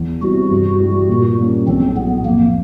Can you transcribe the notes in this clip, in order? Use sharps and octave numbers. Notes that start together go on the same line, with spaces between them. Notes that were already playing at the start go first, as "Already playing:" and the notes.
Already playing: E2
C3 E3 G3 F#4
G2
E3 G3
A#2
G3 A#3 C#4
B1 C4
A2 F#3 B3
F2 A#3